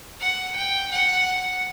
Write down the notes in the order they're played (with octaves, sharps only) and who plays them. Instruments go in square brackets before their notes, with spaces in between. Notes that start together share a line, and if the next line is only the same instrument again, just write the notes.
[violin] F#5
G5
F#5